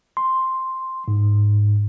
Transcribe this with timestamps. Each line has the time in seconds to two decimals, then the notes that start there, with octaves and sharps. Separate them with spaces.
0.17 C6
1.08 G#2